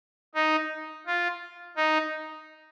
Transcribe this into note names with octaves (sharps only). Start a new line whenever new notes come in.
D#4
F4
D#4